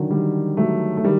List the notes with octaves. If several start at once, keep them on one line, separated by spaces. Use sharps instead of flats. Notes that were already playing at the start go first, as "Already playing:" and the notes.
Already playing: D3 D#3 F#3
D#3 G3
F#3 A3
A3
D#3 G3